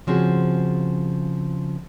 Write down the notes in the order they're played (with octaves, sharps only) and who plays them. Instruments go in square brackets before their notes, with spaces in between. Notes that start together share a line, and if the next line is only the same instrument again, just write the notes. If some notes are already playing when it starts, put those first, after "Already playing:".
[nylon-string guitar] C#3 F3 C4 F#4 G#4